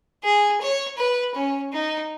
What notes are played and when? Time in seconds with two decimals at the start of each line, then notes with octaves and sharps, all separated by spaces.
0.24 G#4
0.61 C#5
0.98 B4
1.35 C#4
1.72 D#4